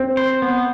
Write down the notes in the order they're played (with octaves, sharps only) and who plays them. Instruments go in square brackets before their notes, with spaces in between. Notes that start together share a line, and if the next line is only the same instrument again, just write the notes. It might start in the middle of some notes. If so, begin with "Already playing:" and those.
Already playing: [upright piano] C4
[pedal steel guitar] C5
B3